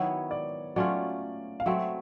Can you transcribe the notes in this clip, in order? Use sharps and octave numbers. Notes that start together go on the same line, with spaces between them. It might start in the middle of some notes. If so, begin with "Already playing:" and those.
Already playing: D#3 F#3 B3 E4 C#5
D5
F#3 A3 C#4 F4 D5
F5
F#3 A3 C4 E5